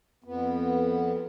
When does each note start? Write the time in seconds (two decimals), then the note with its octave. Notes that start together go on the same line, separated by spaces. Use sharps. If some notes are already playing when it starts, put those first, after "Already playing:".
0.24 F2 B3